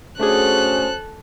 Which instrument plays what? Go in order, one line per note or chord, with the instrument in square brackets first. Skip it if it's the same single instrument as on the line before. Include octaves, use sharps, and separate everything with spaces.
[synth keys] A3 D4 G#4 [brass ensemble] C#4 F#4 C5 [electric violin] A4 F#6